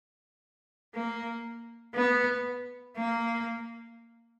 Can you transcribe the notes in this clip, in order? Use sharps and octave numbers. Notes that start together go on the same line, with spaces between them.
A#3
B3
A#3